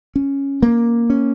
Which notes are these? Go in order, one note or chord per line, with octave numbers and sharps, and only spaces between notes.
C#4
A#3
C#4